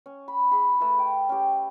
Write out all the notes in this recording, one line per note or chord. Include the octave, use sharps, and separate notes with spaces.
C#4
B5
G#4 B5
A3 B4
G5
C#4 G4